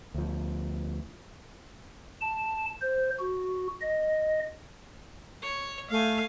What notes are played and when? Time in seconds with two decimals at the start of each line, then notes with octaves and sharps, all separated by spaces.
0.15 D2 F3
2.21 A5
2.81 C5
3.20 F#4
3.81 D#5
5.42 C#5
5.90 A3 F5 G#5